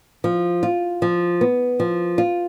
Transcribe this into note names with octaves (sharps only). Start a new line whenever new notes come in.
F3
F4
F3
B3
F3
F4